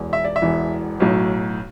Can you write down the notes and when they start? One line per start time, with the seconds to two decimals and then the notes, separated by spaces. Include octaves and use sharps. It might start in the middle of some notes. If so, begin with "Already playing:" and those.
Already playing: E1 E2 E3
0.13 E5
0.25 D5
0.36 E5
0.42 E1 E2 E3
1.00 B1 A2 F#3